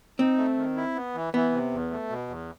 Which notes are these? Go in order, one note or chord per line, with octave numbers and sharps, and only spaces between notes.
C4 D#4
A3
D#3
E4
B3
E3
E3 B3
C3
E2
A3
B2
E2